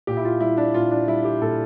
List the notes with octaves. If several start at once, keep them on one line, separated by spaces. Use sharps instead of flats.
A#2 G4
E4
F4
G3 E4
D4
A#2 F4
D4
G3 E4
G4
A#2 A4